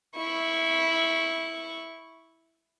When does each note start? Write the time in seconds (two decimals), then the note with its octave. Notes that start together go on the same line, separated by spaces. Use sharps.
0.16 E4 C#6